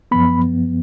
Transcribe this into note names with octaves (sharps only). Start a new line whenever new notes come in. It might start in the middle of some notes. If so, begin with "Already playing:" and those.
F#2 F3 B3 B5